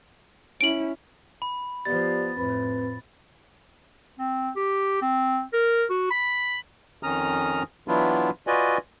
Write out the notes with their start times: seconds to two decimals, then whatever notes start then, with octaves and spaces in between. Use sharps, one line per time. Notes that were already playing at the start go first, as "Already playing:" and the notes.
0.61 C#4 E4 D7 F#7
1.42 B5
1.85 F3 B3 G4 D5 A6
2.36 F2 A2 C4 B4 B5
4.19 C4
4.56 G4
5.02 C4
5.53 A#4
5.90 F#4
6.11 B5
7.03 F2 D#3 C#4 A#5 D#6 F6
7.88 E3 F#3 B3 D4 E4 F4
8.47 F4 F#4 B4 D5 D#5 G#5